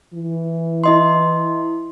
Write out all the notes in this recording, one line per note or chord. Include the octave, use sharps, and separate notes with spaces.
E3
E4 D#5 C6